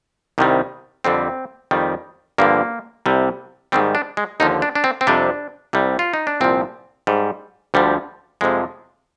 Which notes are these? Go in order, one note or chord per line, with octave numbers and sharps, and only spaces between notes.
C2 C3 D#3 G3
F2 D3 G3 C4
F2 D#3 G3
G2 D3 F3 A#3
C2 C3 G3
G#2 D#3 G3 C4
D4
G#3
D#2 D3 F3 D#4
D4
D4
C4
C4
F2 C3 G3 D4
C2 C3 G3
F4
D#4
D4
C2 A#2 F3 C4
G#2 G3
D2 D3 F3 G3
F2 C3 F3 G#3